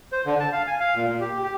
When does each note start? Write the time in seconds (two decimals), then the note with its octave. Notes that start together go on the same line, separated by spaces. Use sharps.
0.12 C5
0.26 D3
0.40 A5
0.52 F5
0.67 G#5
0.80 F5
0.95 A#2
1.08 A#2
1.20 G4
1.43 G4